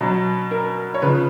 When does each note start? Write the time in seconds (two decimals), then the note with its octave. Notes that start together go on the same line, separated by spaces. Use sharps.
0.01 B2 F#3
0.51 A#4
0.94 C#5
1.02 C#3 F3 B4